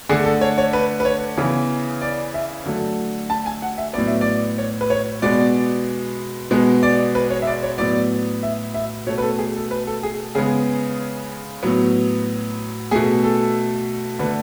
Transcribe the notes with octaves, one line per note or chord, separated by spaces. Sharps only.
D3 A3 G#4
A4
C#5
C#5
B4
B4
C#5
C#3 E3 B3
D5
E5
D3 F#3 A3
A5
G#5
F#5
E5
A2 F#3 B3 D5
E5
D5
C#5
B4
C#5
B2 G#3 B3 D5
B2 G#3 B3
D5
B4
C#5
E5
D5
C#5
A2 F#3 B3 D5
E5
E5
B2 A3 C#5
B4
A4
G#4
A4
B4
A4
G#4
C#3 G#3 B3 G#4
A2 F#3 B3
B2 A3 G#4
A4
D3 A3 B4